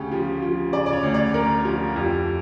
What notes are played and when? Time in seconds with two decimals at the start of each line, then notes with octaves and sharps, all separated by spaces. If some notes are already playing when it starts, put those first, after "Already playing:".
Already playing: D2 C#3 G4
0.11 F3
0.42 F3
0.73 C#3 D5
0.86 D5
0.93 C#5
1.03 D2
1.14 D5
1.34 D2 A#4
1.65 F3
1.96 F2 G4